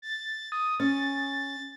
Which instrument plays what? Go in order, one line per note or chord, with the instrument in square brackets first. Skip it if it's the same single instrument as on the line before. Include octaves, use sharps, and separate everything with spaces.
[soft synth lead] A6
D#6
[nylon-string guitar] C#4 [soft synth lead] A6